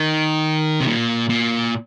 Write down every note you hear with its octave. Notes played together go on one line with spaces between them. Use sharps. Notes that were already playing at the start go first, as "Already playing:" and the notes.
Already playing: D#3
C3
A#2
A#2